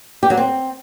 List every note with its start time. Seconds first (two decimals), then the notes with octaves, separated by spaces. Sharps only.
0.23 G4
0.30 F#3
0.37 C4